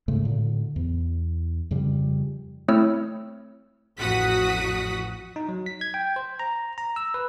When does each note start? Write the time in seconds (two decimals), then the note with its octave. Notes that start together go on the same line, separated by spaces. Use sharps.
0.08 G#2 C#3 G#3 A3
0.24 A2 D3
0.76 E2
1.71 F2 C#3 F3 G3
2.68 A3 C4 E4 C#5 E6 F6
3.98 A1 F2 F#4 F#5 D#6 B6
5.36 D#4
5.49 F#3
5.66 B6
5.81 G#6
5.94 G5
6.16 C5
6.40 A#5
6.78 A#5
6.96 E6
7.14 B4